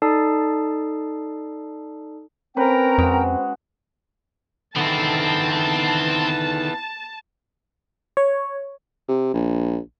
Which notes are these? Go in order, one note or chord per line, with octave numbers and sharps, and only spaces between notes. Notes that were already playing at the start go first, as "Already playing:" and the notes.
D#4 A4 D5 A5 D#6 C7
C4 C#4 A#4 B4 G5 A#5 C#6
F2 G#3 F#4
D3 D#3 B3 C4 E4 A5
C#5
C3
A#1